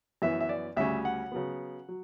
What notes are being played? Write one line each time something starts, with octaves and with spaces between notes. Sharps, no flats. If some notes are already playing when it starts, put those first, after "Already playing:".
F#2 E3 B3 E5
E5
D5
D2 C#3 G3 C#4 E5
F#5
C#3 F#3 B3
F#3